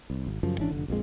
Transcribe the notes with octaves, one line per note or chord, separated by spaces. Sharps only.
C2
G#1
F#2 C#3 F3
G#1 E3 C#4 D4
F1 C#2 D3
A#1 F2 G#3